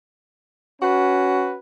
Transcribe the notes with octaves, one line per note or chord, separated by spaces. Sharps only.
C#4 F#4 B4